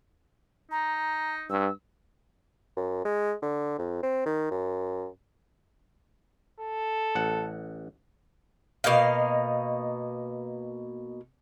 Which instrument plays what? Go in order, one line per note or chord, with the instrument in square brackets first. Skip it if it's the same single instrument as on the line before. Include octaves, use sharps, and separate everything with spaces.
[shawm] D#4 [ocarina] A#5
[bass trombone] G2 [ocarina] E6
[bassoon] F#2
G#3
D3
F2
C4
D#3
F#2
[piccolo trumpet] A4
[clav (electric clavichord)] A1 F#5
[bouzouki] B2 A#3 D#4 F5